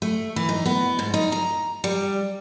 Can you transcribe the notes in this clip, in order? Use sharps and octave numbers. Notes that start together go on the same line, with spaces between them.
A3
E3
D#4
B3
G#2
D#4
A#5
G3